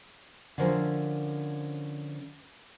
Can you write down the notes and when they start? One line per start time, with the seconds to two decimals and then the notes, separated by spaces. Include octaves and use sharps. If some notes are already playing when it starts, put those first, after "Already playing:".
0.58 D3 F3 C#4 A#4 C5